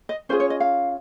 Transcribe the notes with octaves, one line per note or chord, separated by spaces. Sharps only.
D#5
C#4 F4 G#4 C5
C#5
D#5
F5